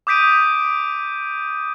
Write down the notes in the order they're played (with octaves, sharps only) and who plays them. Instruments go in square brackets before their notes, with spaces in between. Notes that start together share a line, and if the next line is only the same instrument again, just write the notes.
[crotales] D6 D#6 G6 B6 D7 D#7